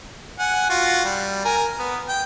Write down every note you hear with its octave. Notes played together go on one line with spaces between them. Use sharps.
F#5 G#5
F4 F#4
G3
A#4 G#5
B3
G5